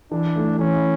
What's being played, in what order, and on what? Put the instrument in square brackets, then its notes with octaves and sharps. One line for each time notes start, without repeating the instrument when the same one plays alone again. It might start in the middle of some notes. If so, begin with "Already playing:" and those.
[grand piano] E3 [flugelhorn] D4
[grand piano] A3 E4
[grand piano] E3 [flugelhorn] C#4